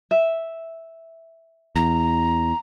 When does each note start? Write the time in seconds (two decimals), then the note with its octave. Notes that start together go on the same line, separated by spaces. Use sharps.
0.11 E5
1.76 E2 A#5